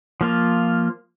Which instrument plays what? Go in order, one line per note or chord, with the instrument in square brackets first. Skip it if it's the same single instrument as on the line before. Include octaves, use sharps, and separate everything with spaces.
[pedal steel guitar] F3 A#3 F4